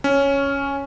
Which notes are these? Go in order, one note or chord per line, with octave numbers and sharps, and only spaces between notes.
C#4